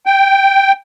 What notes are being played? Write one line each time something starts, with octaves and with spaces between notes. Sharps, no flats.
G5